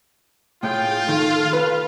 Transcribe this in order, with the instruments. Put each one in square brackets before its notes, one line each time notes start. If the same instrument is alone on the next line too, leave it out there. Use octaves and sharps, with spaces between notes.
[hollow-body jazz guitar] A2 [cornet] F4 [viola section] G#4 G5
[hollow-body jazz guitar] D#3 [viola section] A4 F5
[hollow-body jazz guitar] B4